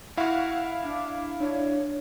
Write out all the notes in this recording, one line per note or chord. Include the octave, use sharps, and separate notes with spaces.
E4 F5 F#5
D4
D4 C#5